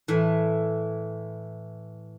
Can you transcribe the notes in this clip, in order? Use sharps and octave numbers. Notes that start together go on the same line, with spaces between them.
A2 E3